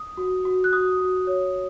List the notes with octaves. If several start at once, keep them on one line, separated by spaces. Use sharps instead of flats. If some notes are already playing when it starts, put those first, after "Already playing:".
Already playing: D#6
F#4
F#4
F#6
F#4 D#6
F#4
C#5